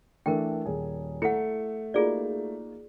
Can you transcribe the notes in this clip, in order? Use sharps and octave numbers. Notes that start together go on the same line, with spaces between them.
E3 A3 D4 A#4 G5
D#1 G#4
A3 E4 F#5 C#7
A#3 D#4 F4 F#4 G#4 D5